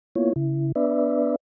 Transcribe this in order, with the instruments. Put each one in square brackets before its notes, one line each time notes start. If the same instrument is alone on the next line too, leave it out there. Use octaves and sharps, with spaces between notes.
[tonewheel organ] A#3 B3 E4 F4 C#5
C#3 E4
B3 D4 B4 D5 E5